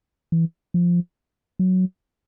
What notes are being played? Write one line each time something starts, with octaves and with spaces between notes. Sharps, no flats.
E3
F3
F#3